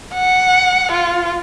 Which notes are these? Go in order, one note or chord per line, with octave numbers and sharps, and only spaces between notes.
F#5
F4